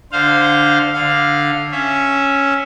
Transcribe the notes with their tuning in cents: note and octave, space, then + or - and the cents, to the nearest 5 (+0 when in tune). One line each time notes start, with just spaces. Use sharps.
D3 +0 C5 -15 F5 +0
D3 +0 F5 +0
C#4 +0 E5 +5